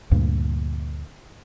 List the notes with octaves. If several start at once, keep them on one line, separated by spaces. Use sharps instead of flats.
D2 G2 A#2